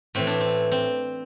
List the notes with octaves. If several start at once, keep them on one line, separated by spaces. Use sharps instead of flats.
A2 E3 C4
D4
C4
C4